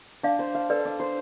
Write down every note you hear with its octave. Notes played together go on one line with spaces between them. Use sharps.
D4 D5 F5
C5
F5
A4 B4 D5
D4
C5